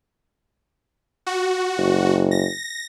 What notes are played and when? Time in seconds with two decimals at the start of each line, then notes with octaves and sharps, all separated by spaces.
1.26 F#4
1.78 F#1
2.31 A#6